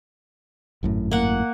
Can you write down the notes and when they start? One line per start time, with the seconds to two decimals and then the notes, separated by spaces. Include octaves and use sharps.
0.83 G#1 F#2 A2
1.11 A#3 F#5